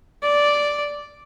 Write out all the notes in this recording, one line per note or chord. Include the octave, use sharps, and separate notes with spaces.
D5